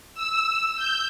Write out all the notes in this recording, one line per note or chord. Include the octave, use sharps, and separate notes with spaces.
E6
G6